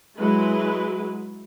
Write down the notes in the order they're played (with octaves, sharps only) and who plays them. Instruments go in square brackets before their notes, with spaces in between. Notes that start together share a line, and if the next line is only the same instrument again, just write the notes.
[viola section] F#3 G#3 E4 B4